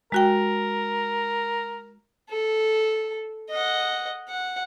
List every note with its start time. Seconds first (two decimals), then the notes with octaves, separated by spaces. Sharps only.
0.12 G#3 F#4 A#4 G5
2.31 A4
3.50 D#5 F#5
4.29 F#5